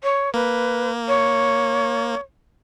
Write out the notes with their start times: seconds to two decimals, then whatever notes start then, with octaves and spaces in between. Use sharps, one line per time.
0.04 C#5
0.34 A#3 B4
1.08 C#5